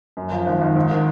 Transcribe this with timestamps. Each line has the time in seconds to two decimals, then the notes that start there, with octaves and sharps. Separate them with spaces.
0.17 F#2
0.32 F3
0.47 G#1
0.61 G#1
0.76 G#2
0.91 D#3